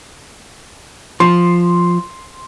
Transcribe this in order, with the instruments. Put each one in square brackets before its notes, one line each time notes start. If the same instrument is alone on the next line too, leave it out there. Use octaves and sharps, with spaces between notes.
[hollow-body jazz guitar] F3 [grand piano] C6